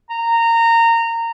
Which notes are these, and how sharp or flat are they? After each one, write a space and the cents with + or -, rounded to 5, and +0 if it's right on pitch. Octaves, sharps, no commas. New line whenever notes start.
A#5 -20